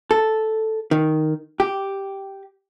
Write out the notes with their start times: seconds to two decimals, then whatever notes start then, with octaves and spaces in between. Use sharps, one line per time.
0.11 A4
0.91 D#3
1.60 G4